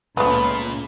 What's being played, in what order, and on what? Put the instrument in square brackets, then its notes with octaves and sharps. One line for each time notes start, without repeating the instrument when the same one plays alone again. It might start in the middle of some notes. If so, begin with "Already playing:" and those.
[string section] C#2 [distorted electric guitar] A#2 [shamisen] A3 B3 [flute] B5